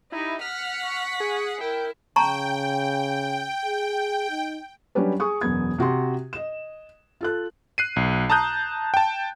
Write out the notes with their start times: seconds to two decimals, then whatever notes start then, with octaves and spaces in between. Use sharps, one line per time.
0.12 D#4 E4 G4
0.41 F#5 F6 B6
0.83 C#6
1.20 G#4
1.61 E4 A#4 G5
2.16 C#3 G5 A5 A#5 C#6
3.65 G#4
4.30 D#4
4.95 F#3 G3 C#4 D4 G4 B4
5.20 G#4 C#6 D#6
5.41 E1 F#2 B3 G#6
5.79 C3 F#4 G4 C6
6.33 D#5 E7
7.21 F4 A4 F#6
7.78 F#6 C7 D#7
7.96 B1
8.30 A5 A#5 D#6 F#6 G6
8.94 G5 A5